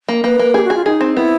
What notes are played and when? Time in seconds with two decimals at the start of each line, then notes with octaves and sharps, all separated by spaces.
0.09 A#3
0.24 A#3 B4
0.39 A#3
0.54 G4 G#4
0.65 F#4
0.70 G#4
0.75 F4
0.86 D#4 G#4
1.01 C4
1.16 B3 E4